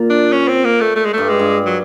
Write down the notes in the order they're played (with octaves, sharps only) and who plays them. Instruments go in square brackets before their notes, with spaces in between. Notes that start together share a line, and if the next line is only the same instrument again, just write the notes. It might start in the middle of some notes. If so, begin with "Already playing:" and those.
Already playing: [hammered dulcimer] A#2
[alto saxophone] D4
C#4
C4
A#3
A3
A3
G#3
[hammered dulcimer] G2 [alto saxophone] A3
[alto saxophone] G#3
[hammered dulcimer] G2
[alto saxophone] F#3